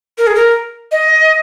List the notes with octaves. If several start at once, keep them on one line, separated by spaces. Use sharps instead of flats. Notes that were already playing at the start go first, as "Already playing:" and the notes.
A#4
G#4
A#4
D#5